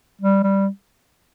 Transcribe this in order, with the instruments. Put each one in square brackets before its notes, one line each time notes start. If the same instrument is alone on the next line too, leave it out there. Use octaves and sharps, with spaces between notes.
[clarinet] G3
G3